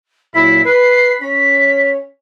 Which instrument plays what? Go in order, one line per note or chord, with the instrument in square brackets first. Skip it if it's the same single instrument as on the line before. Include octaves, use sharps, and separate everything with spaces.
[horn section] A#2 F#3 E4 [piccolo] B6
[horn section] B4 [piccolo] C7
[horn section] C#4 [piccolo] B6